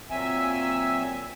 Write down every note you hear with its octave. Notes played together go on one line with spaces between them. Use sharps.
A#2 F#3 C4 E5 G#5 E6